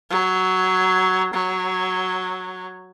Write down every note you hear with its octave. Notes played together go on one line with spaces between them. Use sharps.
F#3
F#3